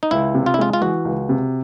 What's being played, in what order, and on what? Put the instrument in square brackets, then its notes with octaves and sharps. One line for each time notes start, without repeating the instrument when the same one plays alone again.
[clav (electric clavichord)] D#4
[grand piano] C#2 [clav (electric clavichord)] E4
[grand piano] C3
[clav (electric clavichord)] F4
E4
[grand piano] G#3 [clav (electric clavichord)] F4
[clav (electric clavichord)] F4
[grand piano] E3 [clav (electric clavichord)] F#4
[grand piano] C#2
C3